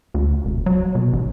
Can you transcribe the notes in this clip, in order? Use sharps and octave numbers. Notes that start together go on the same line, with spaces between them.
D2
E1
F#3
B2
A1